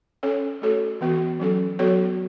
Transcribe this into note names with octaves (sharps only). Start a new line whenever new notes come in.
C#4 A4 C#5
A3 F#4 A4 C#5
E3 B3 F#4
F#3 C#4 A4
F#3 B3 F#4 A4 C#5